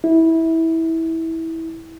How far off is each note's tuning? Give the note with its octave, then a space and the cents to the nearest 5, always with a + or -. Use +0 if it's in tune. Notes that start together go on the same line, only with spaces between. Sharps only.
E4 -20